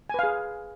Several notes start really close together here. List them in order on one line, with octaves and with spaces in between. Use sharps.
G#5 B4 F5 G#4